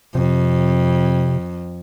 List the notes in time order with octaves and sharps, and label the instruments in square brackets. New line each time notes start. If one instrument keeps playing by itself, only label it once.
[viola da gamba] F2 [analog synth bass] C3